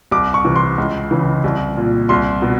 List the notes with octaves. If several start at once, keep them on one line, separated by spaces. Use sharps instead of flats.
C2 D6
C#6
C3 E3
C6
C#2
C#3 E3
C2
A#2
C2 C6
B2